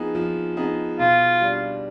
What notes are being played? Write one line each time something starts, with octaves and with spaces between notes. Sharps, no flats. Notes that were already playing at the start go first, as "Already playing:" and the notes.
Already playing: F3 B3 D#4 G#4
F3
B3 D#4 G#4
B2 F4
G3 D4